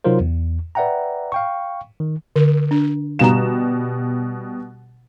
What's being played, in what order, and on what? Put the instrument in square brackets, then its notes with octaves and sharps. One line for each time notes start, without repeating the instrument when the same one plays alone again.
[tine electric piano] C3 F#3 D#4 F4 A#4 C5
E2
B4 D5 E5 F#5 G5 A#5
F5 G5 C#6
D#3
[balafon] D3 A#4
D4
[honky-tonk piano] B2 G3 E7 [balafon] F5 A#5